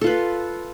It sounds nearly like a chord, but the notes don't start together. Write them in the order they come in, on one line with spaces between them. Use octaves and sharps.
A4 F4 B4